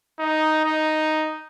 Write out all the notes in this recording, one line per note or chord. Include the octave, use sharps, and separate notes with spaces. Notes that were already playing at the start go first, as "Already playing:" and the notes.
D#4
D#4